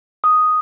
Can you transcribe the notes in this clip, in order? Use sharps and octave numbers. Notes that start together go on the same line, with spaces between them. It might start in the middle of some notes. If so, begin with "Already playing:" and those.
D#6